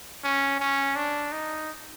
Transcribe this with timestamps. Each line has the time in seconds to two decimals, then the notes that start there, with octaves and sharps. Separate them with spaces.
0.24 C#4
0.60 C#4
0.96 D4
1.32 D#4